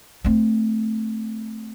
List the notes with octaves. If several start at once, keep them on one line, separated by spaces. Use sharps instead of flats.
A3 C4